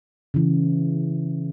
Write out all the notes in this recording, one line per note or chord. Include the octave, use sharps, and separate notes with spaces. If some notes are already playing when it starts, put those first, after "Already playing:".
C#3 E3